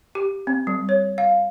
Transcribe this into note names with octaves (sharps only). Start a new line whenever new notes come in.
G4
C4
G3
C#5
F5